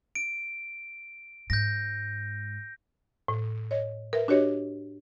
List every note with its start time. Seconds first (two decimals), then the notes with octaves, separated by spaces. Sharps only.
0.15 D7
1.50 G#2 G6 A#6
3.28 A2
3.71 C#5 D#5
4.13 A#4 B4 E5
4.28 D4 F#4 G4 C#5 D#5